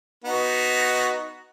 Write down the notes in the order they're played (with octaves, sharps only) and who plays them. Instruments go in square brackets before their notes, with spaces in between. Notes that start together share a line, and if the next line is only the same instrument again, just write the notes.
[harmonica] B3 D#4 F#4